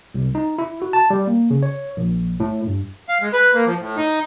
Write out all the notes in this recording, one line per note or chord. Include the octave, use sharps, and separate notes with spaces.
C2
D#4
E4
F#4
A5
G3
A#3
C#3
C#5
A#1
A2
G2
F5
G#3
B4
A#3
F3
A2
D#4